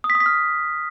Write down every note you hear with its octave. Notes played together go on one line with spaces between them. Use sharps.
D#6
B6
D#6
B6
F6